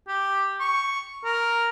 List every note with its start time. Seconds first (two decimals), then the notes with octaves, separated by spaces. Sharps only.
0.08 G4
0.60 C#6
1.25 A#4